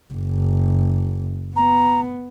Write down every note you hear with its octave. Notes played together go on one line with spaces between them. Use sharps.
F#1
B3 A#5